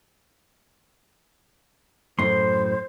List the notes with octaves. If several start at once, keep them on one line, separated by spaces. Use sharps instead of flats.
F#2 A2 C5 C6